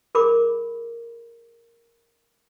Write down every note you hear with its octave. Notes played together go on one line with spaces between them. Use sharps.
G#4 A#4 B5 D6